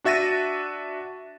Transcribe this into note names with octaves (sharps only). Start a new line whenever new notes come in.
D4 F#4 E5 A6 A#6 D#7